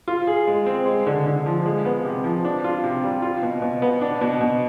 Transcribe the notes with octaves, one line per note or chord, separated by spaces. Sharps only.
F4
G#4
G#3
C4
G#3
D3
D3
F3
G#3
B3
C3
F3
D4
F4
C3
G3
F4
B2
B2
B3
D4
B2
B2